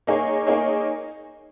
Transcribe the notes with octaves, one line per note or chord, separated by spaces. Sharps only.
A#3 D#4 G#4 C#5
A#3 D#4 G#4 C#5